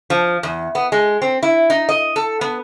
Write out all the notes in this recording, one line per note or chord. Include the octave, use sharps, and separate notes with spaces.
F3
E2
B3
G#3
C4
E4
D#4
D#5
A4
B3